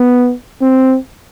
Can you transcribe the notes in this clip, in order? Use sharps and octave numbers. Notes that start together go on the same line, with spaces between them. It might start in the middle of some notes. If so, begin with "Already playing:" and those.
Already playing: B3
C4